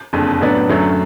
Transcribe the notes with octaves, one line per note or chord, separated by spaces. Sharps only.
F#1 F2 D3
A2 F#3 B3 D4
F#2 D3 F#3 A3